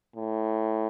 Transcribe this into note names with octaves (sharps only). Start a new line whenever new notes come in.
A2